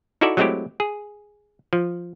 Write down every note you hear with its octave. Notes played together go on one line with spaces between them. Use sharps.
D#4 E4 F#4 A4 D5 E5
F#3 G#3 A3 C4 E4 G4
G#4
F3